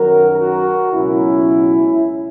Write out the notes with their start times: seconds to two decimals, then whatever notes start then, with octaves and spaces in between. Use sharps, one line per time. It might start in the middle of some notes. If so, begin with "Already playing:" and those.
Already playing: F#2 D#3 F#3 F#4 A#4
0.38 F#4 A#4
0.92 C#2 B2 F#3 C#4 E4